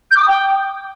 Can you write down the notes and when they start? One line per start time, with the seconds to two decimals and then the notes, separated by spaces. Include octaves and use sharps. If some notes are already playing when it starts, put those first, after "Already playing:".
0.11 G6
0.16 D6
0.22 D#6
0.27 G5